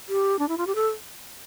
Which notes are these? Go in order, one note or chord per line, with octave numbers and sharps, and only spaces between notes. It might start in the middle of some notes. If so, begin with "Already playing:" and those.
G4
D4
E4
F4
G4
A4